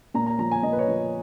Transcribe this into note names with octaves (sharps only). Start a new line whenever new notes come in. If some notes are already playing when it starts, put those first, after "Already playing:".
A#2 A#5
A#5
F3 A#5
G#5
A#2 D#5
B4
C#5
F3